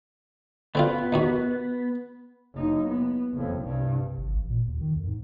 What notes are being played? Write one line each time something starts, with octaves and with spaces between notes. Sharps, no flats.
D3 B3 C4 F4
A#1 D#2 F#4
F#1 D#4
B3
F#1 F2
C2 G2
G#1
A1
A#2
D#2
D#3
F2
G#2